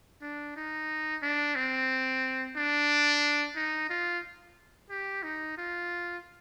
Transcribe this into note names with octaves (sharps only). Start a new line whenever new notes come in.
D4
D#4
D4
C4
D4
D#4
F4
G4
D#4
F4